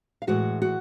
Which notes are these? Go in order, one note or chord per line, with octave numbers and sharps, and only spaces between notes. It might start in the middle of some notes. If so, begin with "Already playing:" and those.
F5
A2 E3 G#3 F#4 F#5
F#4 F#5